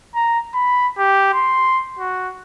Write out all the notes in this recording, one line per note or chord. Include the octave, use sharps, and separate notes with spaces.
A#5
B5
G4
C6
F#4